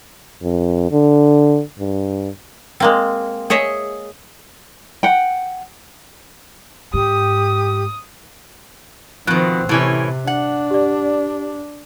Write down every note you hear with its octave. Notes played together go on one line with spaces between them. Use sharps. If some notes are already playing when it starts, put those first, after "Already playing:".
F2
D3
G2
G#3 A#3 C4
G#4 C#5 D#5 E5
F#5 G5
G#2 G4 D#6
B2 D#3 F3 C4 F#6
A2 C3 E3 C#4
D4 F#5
G4 D5